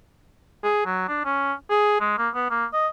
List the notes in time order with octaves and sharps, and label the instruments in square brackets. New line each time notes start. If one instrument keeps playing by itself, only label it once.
[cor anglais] G#4
F#3
D4
C#4
G#4
G#3
A#3
B3
A#3
D#5